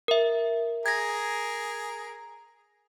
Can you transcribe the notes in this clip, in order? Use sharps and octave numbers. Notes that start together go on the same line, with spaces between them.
A#4 E5
G#4 A#4 G#6 A#6